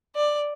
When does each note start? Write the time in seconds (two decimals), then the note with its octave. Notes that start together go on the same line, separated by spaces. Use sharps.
0.16 D5